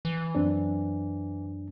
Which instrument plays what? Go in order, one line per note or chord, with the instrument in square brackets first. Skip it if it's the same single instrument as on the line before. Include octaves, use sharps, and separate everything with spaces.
[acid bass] E3
[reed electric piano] F#2 C4 D4